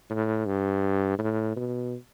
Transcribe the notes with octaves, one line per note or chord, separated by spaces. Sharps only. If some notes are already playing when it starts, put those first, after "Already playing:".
A2
G2
A2
B2